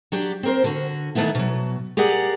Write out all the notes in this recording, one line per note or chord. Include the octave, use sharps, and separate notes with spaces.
F#3 D4 G4
C4 A#4 C5
D3 F#4
D#3 E3 A3 B3 E4
B2 F#3
G4 G#4 A#4 D5 F#5